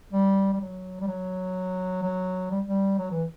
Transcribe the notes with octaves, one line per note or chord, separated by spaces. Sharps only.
G3
G3
F#3
G3
F#3
F#3
G3
G3
F#3
E3